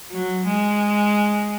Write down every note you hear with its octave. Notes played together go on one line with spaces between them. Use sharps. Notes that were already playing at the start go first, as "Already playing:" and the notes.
F#3
G#3